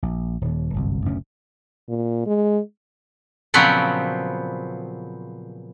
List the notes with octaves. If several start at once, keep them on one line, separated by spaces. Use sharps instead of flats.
A#1
D#1 D#2
G1 C2 F#2
F#1 D2 B2 C#4
A#2
G#3
A#2 C#3 F3 F#3 B3 C4